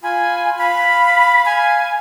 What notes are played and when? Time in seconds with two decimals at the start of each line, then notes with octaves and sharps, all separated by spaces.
0.03 F4 G#5 B5
0.58 F5 B5
1.46 G#5